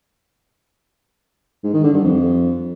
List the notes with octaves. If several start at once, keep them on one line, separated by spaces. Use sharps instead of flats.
G#2
D#3
D3
G2
F2